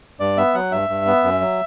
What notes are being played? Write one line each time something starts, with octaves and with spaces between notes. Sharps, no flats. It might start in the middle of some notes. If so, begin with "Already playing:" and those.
G2 D5
B3 E5
F#3 F#5
G2 E5
G2
B3
F#2
F#3